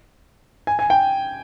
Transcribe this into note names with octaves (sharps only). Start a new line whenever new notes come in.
G#5
G#5
G5